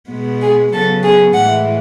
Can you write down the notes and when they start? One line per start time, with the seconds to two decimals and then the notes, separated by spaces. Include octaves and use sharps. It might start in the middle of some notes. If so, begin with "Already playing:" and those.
0.09 B2 G#3 B3
0.42 G#4
0.73 C#3 F#3 B3 A4
1.04 G#4
1.35 A2 E3 G#3 F#5